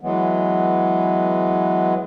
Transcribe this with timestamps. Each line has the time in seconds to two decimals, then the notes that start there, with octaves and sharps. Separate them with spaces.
0.01 E3 F#3 G#3 B3